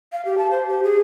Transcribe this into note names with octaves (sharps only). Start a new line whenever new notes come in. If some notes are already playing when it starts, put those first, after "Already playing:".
F5
G4
A5
C5
G4
G#4